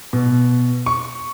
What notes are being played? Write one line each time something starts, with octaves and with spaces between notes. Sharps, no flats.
B2
C#6